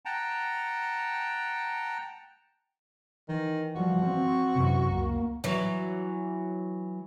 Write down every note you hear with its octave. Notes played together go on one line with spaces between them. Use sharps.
F#5 G5 A5 A#5
D#3 E3
F3 G3 F#4
C4
F#2 C3 E3
C#2 A#3
E3 F#3